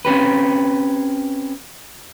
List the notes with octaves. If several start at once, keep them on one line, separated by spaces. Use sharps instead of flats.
C4 C#4 G4 B4